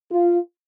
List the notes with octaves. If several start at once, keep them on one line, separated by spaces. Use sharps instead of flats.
F4